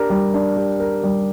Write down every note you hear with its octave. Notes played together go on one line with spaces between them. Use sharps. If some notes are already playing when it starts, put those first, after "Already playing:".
Already playing: D4 G4 A#4
G3
D4
G4
A#4
G3